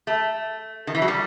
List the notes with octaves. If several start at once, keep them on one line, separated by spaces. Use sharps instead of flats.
A3
D#3
E3
F#3
G3